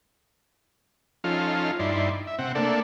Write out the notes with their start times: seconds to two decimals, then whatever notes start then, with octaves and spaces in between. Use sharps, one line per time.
1.24 F3 C#4 D#4 F4 A4 F6
1.79 G2 D#4 E4 D5 C6
2.27 E5
2.39 C3 C4 F#5
2.55 A3 A#3 D4 A4 D5